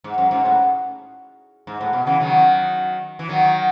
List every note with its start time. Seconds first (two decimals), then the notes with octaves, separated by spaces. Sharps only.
0.04 G#2
0.18 F#2
0.31 G#2
0.45 A2
1.67 G#2
1.81 A2
1.93 B2
2.06 C#3 E3
2.20 D#3 F#3
3.19 E3
3.28 D#3 F#3